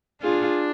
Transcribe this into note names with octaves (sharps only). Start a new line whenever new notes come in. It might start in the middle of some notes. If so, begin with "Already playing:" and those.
D4 F4 G#4